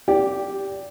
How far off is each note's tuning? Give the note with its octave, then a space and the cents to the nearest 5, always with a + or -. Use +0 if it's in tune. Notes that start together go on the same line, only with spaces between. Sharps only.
G4 +0 D5 -25